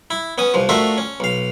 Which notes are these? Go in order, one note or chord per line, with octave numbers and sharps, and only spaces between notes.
E4
B3 C#4 D#6
C2 F3
A3 D4 F4 F#4 A#4 E5
C#4
B1 F5